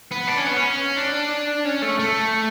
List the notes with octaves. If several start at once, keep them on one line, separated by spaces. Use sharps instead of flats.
B3
D4
C#4
B3
C#4
D4
C#4
A3
A3